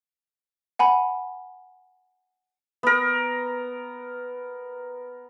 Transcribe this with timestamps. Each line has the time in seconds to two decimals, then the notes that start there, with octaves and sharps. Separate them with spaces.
0.79 F#5 G#5 B5
2.83 B3 A#4